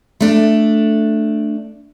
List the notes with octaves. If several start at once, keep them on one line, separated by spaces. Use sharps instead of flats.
A3 D4